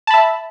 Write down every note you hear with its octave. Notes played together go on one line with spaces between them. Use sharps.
E5 A5 B5